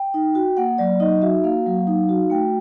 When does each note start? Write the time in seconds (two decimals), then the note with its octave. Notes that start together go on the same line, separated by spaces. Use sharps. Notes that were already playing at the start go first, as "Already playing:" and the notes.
Already playing: G5
0.14 D#4
0.35 F#4
0.57 A#3 F#5
0.78 F#3 D5
1.00 D#4 D#5
1.22 F#4 E5
1.44 A#3 F5
1.66 F#3
1.87 D#4
2.09 F#4
2.30 A3 G5